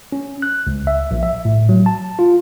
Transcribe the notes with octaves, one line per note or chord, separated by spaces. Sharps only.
C#4
F#6
C#2
E5
A#1
E5
A2
F#3
A5
F4